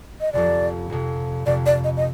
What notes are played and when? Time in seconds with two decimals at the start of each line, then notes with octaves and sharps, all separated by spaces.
0.21 D#5
0.33 F1 F2 C3 D5
0.90 F1 F2 C3
1.46 F1 F2 C3 D5
1.66 D5
1.84 D#5
1.97 D#5